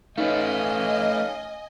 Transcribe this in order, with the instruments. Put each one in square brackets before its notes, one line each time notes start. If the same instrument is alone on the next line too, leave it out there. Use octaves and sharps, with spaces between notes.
[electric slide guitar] A3 B4 [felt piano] C#4 D#4 [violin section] D#5 G#5 [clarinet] F5